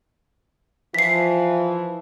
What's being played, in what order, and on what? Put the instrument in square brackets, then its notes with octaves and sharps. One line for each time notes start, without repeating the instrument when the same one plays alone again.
[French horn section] E3 F3 [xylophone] B6 C7